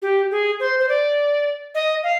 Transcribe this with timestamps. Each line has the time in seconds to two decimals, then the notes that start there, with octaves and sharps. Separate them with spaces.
0.02 G4
0.31 G#4
0.60 C5
0.80 C5
0.89 D5
1.75 D#5
2.03 F5